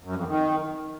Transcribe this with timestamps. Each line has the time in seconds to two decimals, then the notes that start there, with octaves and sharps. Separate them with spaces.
0.04 F#2
0.16 F2
0.27 D#3